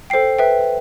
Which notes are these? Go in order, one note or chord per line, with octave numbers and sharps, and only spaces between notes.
A4 C5 G5 C7
B4 E5 G5